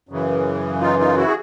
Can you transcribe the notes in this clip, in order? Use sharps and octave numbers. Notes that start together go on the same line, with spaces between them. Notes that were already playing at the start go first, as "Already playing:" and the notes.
F#2 C#3 E3
D#4 F4
D#4 F4
E4 F#4
G#4